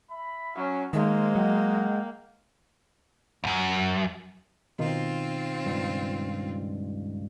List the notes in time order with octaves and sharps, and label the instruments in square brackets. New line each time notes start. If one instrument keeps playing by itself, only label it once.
[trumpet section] E5 B5
[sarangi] F#3 [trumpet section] C#4
[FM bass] D#3 [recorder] G#3 [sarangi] A#3 [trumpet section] C5
[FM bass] F#3 [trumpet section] D#5 F#5 G5
[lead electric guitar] C#2 F#2
[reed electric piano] B2 D#3 D#4 [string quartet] C4 F4
[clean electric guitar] C#2 G2